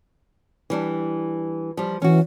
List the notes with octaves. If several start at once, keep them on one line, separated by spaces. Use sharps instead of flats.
E3 G3 D4
F3 G3
E3 C#4 F#4